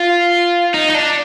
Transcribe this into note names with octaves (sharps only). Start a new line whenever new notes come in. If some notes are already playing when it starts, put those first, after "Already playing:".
Already playing: F4
D#4
D#4
D4